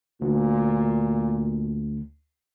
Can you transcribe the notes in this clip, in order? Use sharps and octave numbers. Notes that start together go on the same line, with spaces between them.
D2 A#2